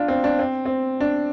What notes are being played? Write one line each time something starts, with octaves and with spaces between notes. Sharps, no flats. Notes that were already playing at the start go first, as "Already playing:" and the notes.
Already playing: D4 F4
C4
D4
C4
C4
D4